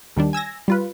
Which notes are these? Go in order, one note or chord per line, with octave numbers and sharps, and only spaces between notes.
D#2 D#3 G3 D4
G#5 E6 G#6 A#6
G3 F4 B4